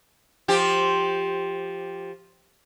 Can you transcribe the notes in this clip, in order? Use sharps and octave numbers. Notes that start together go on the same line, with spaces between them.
F3 G4